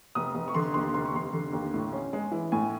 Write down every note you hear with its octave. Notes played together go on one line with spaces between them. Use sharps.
F1 D#6
F1
C#6
D3 C6
D#2 C6
F1 C6
C#6
F1 C6
D3
D#2
A2
C#4
G#3
E3
A2 G#5